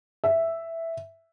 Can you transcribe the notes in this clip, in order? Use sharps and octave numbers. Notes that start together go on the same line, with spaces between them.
E5